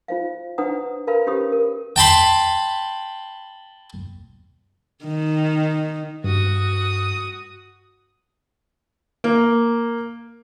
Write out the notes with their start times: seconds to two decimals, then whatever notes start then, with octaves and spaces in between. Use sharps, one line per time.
0.08 F4 C5 F5
0.58 D4 B4 C5 F#5 A#5 D#6
1.07 A#4 B4 F5 A#5 B5
1.27 C#4 G4 C5 B5 D#6
1.52 A#4
1.96 G5 A5 B5 C6
5.05 D#3
6.24 G2 F#4 D#6
9.24 A#3